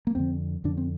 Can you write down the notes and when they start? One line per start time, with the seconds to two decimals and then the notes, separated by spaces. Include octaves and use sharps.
0.07 A#3
0.15 F2 D3 C4
0.64 F2 D3 D4
0.77 C4